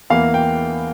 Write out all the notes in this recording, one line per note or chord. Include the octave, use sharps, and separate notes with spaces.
E2 E3 A#3 F5
G5